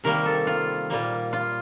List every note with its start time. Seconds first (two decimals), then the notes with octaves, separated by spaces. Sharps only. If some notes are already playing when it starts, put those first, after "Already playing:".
0.04 C3 D#3 G3 A#3 A#4
0.26 A4
0.47 F4
0.90 A#2 G3 A#3
1.33 F4